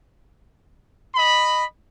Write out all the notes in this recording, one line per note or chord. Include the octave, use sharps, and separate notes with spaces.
D#5 B5